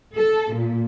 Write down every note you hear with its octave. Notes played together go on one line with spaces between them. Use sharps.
A4
A#2